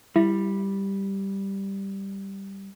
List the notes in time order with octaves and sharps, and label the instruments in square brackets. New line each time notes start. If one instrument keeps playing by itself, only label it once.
[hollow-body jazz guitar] G3 [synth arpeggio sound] E4